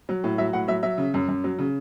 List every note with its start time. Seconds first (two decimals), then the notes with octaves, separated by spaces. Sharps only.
0.09 F#3
0.24 A2
0.38 F#3 E5
0.53 A2 F#5
0.68 F#3 E5
0.83 F#3 E5
0.98 C#3
1.14 F#2
1.28 F#2
1.44 F#3
1.59 C#3